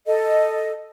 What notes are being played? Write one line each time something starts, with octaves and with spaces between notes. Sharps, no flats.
A4 D#5